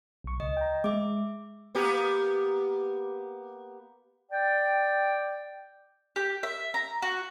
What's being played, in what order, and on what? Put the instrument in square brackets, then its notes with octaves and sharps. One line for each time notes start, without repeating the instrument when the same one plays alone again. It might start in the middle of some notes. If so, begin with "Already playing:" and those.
[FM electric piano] B1 C#6
[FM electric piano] C#2 [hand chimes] D#5
[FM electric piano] G5 A#5
[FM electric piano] G#3 [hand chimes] E5 D6
[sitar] A#3 B3 G4
[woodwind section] D5 G5
[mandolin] G4
E5
A#5
F#4